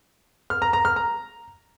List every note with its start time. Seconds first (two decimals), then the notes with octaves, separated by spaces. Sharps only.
0.50 F6
0.62 A#5
0.73 A#5
0.85 F6
0.96 A#5